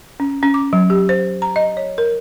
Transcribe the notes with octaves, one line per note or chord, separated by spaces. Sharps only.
C#4
C#4
D6
F#3
G4
C5
A#5
D#5
C#5
A#4